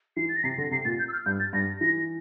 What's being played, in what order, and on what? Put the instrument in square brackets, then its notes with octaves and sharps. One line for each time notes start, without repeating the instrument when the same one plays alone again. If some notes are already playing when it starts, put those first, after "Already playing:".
[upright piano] E3 [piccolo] C7
[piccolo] A6
A#6
[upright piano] C3 [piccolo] C7
[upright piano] D3 [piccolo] A#6
[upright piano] C3 [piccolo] C7
[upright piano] A#2 [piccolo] A6
[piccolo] G6
E6
F6
[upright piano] G2 [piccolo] G6
[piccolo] A6
[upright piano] G2 [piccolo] A#6
[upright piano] E3 [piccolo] A#6